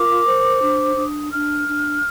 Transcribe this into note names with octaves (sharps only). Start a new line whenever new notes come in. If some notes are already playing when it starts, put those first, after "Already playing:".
Already playing: F4 A#4 D6
C5
D4
D4 D#6
D4 F6
D4